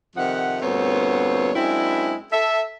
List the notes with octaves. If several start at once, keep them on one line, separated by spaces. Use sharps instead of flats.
F2 C3 D#3 F3 F#5
D2 G2 A#2 B3 C4 C#5
F#2 G#3 C4 D4 E4
A4 E5